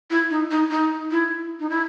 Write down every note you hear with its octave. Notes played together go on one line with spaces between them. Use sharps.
E4
D#4
D#4
D#4
E4
D#4
E4